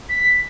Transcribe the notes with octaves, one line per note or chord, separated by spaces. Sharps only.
B6